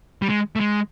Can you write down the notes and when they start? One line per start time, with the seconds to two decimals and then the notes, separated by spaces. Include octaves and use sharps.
0.22 G3
0.29 G#3
0.56 A3
0.60 G#3